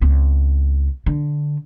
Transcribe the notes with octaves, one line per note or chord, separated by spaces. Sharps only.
C#2 C4
D3